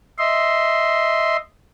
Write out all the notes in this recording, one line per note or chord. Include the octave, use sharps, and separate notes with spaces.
D#5 E5 C6